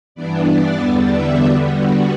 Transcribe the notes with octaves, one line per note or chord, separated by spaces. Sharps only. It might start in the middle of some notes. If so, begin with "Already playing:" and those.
G2 E3 B3 D4 D5
D5
E2 D3 G3 B3 D4 E5
E5
D3 G3 B3 F#4
F#4